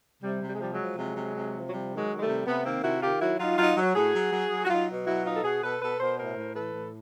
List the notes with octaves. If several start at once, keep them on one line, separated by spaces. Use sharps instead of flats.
C3 G3
C3
G3
G#3
F3 G3
F#3 G#3
F3
C3 F#3 G#3
C3
C3
F3
F#3
C3 G3
D#3
F#3 G#3
D#3
G#3
G3 A3
C3
C3 A3 B3
D#3 A#3 C4
C3 E4 F#4
D#3 F4 G4
F#3 E4 F#4
F#3 D#4 F4
F#3 D#4 F4
F#3
A2 F#4 G#4
F#3
F#3
F#3
F#4
F#3 D#4 F4
B2
F#3 E4 F#4
B2 D#4 F4
A4
B2 F#4 G#4
B2 A4 B4
B2 A4 B4
B2 A#4 C5
A2 A#4 C5
A2
E3 A4 B4
A2